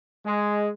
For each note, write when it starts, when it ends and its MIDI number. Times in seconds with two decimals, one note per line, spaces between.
0.24 0.69 56